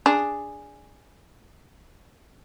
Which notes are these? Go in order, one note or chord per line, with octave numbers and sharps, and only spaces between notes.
D4 G#4